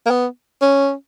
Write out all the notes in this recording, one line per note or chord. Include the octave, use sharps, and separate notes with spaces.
A#3
B3
C#4